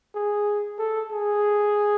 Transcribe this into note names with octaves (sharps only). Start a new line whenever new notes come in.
G#4
A4
G#4